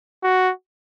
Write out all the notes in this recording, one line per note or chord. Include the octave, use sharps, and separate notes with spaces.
F#4